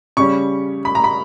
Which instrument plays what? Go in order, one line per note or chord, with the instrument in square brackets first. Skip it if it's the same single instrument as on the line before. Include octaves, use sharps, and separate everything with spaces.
[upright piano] C#3 G3 C#4 C#6
B5
A#5
B5